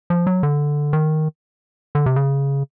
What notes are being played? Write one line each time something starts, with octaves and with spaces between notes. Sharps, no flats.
F3
F#3
D3
D#3
D3
C3
C#3